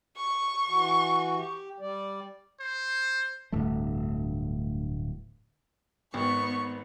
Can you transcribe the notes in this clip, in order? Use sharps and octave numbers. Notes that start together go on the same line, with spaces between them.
C#6
E3 F#4
G4
G3 D5
C5
D1 G2 A3
G#1 B3 C#6